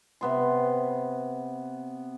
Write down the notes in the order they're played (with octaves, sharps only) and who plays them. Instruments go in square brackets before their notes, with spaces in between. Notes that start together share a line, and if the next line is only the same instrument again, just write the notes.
[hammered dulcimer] C3 B3 C6